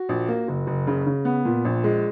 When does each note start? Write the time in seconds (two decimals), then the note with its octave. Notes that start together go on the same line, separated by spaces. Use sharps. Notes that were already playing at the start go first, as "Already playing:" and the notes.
Already playing: F#4
0.09 A#1
0.28 A#3
0.48 F#1
0.67 F#1
0.87 C#3
1.06 C#3
1.25 B3
1.45 A#2
1.65 A#1
1.84 G#3